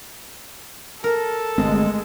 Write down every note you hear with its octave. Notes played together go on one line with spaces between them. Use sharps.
A4 A#4
G1 G#3 A3 C4